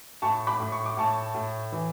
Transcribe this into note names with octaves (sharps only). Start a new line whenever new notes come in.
A2 A5 C#6
B5 D6
A2
C#6
D6
A2 A5 C#6
A2
E3